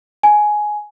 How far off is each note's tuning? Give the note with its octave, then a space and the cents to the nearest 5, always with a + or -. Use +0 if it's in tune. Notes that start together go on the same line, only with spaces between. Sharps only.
G#5 +10